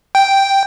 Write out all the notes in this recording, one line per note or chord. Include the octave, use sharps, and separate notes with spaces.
G5